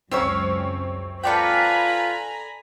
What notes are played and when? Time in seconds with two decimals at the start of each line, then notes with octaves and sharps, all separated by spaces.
0.11 C#2 F#2 C4 C#4 C#5 E6
1.23 F4 A4 B4 D5 G5 G#5 A#5 B5